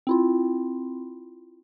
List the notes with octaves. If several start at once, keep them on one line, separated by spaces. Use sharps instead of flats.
C4 E4 F4